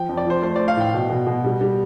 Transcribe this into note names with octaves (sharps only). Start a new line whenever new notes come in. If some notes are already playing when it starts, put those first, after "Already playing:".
Already playing: F3 G5
F2
D5
F3 C5
A3 C5
A3 D5
F5
A2 G5
B2
B2
B2
G3
G3